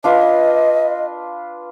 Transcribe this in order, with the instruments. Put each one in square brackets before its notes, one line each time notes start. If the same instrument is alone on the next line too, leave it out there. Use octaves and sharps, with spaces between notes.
[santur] D4 F4 B4 [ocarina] D#5